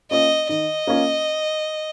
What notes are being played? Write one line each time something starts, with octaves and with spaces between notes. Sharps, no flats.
A#3 C#4 F4 D#5
D#3 D#5
A#3 C#4 F4